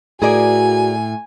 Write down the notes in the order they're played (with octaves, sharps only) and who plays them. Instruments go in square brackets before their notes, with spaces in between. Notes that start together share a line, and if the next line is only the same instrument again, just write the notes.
[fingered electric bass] A2 [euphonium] F#4 [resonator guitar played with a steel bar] G#4 A#4 D5 [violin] G#5